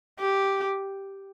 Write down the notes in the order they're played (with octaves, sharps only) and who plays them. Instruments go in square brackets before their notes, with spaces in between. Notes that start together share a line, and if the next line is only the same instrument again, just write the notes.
[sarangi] G4